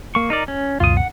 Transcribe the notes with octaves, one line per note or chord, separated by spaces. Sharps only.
A#3 C#6
D#4 A#4 D5
C#4
C#2 F#2 B2 F4 D#6
F#5